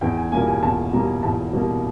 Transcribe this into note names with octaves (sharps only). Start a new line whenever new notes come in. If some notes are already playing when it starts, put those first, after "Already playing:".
E2 G5
G#5
B2 G3 A#3 G#5
G#5
E2 A5
B2 G3 A#3 A#5
E2 A5
B2 G3 A#3